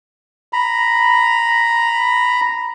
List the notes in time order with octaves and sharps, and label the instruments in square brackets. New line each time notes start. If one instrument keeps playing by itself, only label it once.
[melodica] A#5 B5